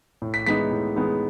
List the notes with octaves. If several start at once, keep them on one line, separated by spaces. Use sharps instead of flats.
A2
B6
G#3 B3 D#4 B6
A2
G#3 B3 D#4